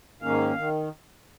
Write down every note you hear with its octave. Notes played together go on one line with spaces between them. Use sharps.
G#2 D#3 A#3 C#4 F5
D#3